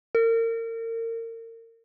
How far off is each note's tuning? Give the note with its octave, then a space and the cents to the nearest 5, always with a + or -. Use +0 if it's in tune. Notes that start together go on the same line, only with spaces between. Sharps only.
A#4 -35